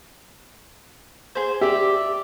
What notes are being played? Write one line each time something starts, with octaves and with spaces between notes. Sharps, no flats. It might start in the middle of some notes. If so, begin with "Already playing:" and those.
G#4 C5
G4 D5 E5